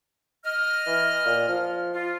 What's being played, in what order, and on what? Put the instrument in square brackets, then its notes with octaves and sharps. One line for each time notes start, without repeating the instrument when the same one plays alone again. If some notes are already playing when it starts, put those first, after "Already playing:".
[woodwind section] D#5 F6
[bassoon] E3
A#2
F3
[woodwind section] F4